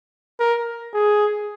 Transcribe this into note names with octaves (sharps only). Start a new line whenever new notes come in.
A#4
G#4